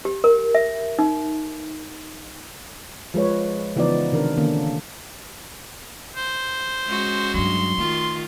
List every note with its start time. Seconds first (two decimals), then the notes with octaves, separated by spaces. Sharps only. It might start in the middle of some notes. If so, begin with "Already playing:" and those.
0.05 G4
0.24 A#4
0.55 E5
0.99 D#4
3.14 F3 G#3 B4 C#5
3.76 C#3 E3 F3 B3 D#4 D5
4.12 C3 D#3 D4 A#4
4.37 D3 D#3 A#3 C#4 D4
6.16 C5
6.88 G#3 C#4 F#4
7.34 G2 F#3 C6
7.78 D#3 A3 F4